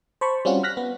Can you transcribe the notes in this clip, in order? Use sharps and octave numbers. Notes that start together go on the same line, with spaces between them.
C5 A5 B5 C#6
G3 C4 C#4 F4 F#4
F6 F#6 A#6 B6
B3